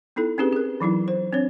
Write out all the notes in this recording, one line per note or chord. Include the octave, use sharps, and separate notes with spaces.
B3 D#4 E4 A4
C4 C#4 D#4 G4 G#4 B4
G#4 A#4
E3 F#3 D#4 E4
C5
C4 D4 C#5